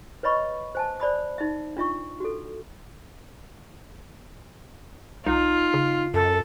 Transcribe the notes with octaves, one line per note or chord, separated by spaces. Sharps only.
B4 C#5 D#5 B5 C#6
C5 G#5 A5
C5 D5 B5 D#6
D#4 E5
D4 F4 E5 C#6
F#4 A4
C2 D#4 F4
C#3
F#2 A4